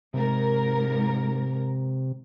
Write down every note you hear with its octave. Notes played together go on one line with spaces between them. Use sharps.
G#2 C3 A#4